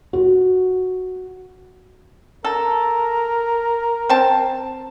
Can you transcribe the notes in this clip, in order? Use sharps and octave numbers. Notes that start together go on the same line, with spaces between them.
F#4
A4 A#4
C4 A5